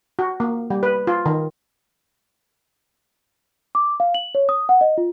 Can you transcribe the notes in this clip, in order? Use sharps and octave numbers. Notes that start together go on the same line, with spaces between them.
F#4
A#3
G3
B4
F4
D#3
D6
F5
F#7
C#5
D#6
F#5
D#5
F4